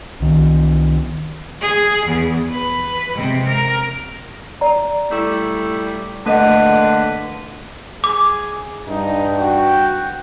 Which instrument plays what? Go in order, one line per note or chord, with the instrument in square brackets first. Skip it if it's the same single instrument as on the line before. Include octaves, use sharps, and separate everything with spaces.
[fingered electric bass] C2 D#3
[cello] G#4
E2
B4
C3 G#3
A#4
[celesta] D5 A#5
[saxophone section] G3 A3 E4
[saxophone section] D3 A#3 B4 [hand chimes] A3 D#5 F#5
[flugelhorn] G#4 [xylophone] D6
[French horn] G2 [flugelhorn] D#4
[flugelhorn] F#4 [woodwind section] G5